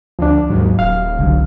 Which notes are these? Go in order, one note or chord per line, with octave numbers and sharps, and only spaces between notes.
D2 F3 D4
D#2 G#2 F#3
D#1 F5 F6
F#1 C2 D3 F#3